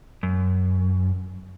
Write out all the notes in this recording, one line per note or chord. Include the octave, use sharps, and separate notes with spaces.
F#2